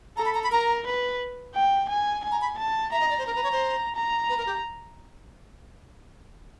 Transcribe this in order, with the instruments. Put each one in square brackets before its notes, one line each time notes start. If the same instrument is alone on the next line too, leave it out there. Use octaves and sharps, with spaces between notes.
[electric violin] A4 [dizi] A#5
[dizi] B5
A#5
B5
[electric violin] A#4 [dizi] A#5
[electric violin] B4
G5
G#5
G#5
[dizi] A#5
B5
[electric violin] A5
[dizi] E5 [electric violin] A#5
[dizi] D#5
D5
C5
[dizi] A#4 [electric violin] A#5
[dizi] B4
C#5
C5
[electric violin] A#5
[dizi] B4
A#4
G4